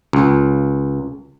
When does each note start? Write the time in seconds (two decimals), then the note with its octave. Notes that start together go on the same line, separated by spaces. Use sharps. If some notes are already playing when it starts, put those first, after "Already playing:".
0.13 C#2